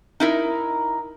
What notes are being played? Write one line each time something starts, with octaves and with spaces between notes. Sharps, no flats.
D#4 E4 A#4